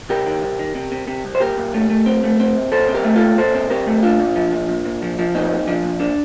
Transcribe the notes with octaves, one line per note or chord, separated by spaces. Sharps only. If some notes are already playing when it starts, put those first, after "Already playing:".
C3 G4 A#4
D#3
C2
D#3
C3
C3
C3
C2
C5
A#2 G4 A#4
A#2
A3
A3
C4
A3
C4
A#2
A#2 A4 C5
C4
G4 A#4
A3
F4 A4
A#2
A#2 A4 C5
C4
C4 G4 A#4
A3
A#2 D4 F4
A#2
F3
A#2
A#2
A#2
F3
F3
A#2 C4 D#4
A#2
F3 D4
A#2
A#2 D4